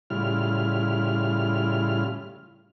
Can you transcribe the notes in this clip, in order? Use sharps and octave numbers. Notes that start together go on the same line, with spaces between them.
A2 C#3 G3 E4 F4 F6